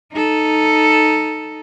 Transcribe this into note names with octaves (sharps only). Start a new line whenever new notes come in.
D#4 A4